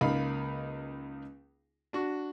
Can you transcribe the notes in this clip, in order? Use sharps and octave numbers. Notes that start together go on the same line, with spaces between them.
C#2 A#3 D#4 F5 B5
D4 F#4